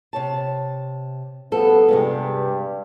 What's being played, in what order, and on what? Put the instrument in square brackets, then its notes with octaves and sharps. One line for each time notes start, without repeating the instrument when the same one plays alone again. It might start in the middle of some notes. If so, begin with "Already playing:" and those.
[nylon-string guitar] C3 C#5 A5
[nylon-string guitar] F3 G3 A4 [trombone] B3
[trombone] G2 [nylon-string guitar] C3 G#3 B3